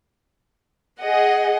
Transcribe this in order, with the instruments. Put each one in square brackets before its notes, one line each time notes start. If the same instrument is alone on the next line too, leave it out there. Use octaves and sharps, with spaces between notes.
[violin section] G#4 D#5 F#5